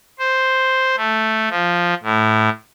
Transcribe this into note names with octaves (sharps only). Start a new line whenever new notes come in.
C5
A3
F3
A2